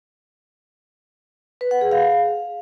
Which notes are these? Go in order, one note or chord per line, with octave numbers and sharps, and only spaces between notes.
B4
F#5
G#4
F5